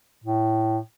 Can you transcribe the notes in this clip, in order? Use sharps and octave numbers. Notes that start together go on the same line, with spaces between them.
A2